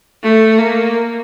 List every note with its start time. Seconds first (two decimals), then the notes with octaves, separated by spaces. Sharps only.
0.23 A3
0.59 A#3